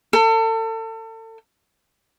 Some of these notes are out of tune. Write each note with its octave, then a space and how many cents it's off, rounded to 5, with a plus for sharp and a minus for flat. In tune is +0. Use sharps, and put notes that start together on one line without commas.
A4 +35